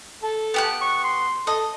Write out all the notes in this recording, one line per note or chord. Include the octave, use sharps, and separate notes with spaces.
A4
B3 G4 F#6
C#6
C6
A4 D#5